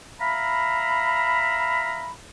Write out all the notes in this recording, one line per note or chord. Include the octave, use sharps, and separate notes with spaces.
E5 F5 A#5 B5